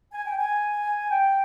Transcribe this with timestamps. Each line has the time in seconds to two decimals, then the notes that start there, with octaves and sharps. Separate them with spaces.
0.13 G#5
0.26 G5
0.39 G#5
1.11 G5